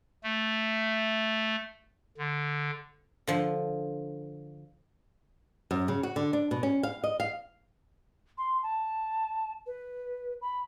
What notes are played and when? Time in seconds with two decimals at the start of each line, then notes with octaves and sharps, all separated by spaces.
0.24 A3
2.18 D3
3.27 D3 F3
5.71 F#2
5.88 C#3
6.03 F#4
6.16 D3
6.33 D4
6.51 B2
6.63 C#4
6.83 F5
7.04 D#5
7.20 F5
8.38 C6
8.63 A5
9.67 B4
10.41 B5